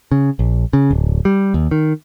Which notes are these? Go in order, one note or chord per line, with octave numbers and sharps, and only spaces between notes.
C#3
A#1
C#3
D1
G3
D#2
D#3